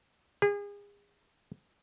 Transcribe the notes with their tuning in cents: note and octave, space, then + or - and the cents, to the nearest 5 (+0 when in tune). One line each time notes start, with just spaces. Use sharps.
G#4 -35